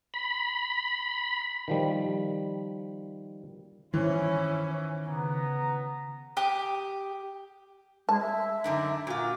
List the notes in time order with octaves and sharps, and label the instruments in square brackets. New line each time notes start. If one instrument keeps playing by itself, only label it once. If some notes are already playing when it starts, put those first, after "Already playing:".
[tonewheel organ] B5
[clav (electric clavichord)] D#3 F3 G3
[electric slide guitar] D#3 C5 [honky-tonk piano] E3 [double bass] C#4 [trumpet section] E4
[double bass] C#3 [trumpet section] B3 A#5
[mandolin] G4 D#6
[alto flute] G#3 [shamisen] A5
[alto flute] E5
[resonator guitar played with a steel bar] F#2 D3 D#4
[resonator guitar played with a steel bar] A#2 F4 [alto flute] F#4